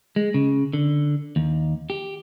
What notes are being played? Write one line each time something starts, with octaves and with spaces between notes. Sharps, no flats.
G#3
C#3
D3
D#2
G4